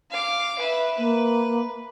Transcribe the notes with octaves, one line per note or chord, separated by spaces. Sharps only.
F5 D6
B4 E5
A#3 B4